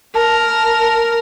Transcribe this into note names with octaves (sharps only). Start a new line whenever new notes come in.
A#4 A5